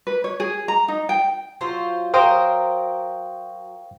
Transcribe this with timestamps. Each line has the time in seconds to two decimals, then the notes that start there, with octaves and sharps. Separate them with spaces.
0.07 B4
0.24 C#5
0.40 G#4
0.68 A#5
0.88 D#4
1.09 G5
1.61 F#3 F4 C5
2.14 F#3 A#4 C5 F5 G5 D#6